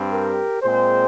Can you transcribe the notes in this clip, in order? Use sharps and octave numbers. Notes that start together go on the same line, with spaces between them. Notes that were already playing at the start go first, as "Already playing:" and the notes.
Already playing: G2 G3 C4
G4 A#4
A#2 G#3 C4 G#4 C5